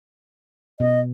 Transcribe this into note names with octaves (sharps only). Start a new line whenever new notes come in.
B2 D#5